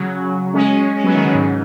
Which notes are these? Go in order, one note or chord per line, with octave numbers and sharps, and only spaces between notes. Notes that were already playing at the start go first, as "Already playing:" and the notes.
Already playing: C#3 F#3
G#3 C#4
G#3 C#4
F#3 B3
D#3 G#3
C#3 F#3
G#2 C#3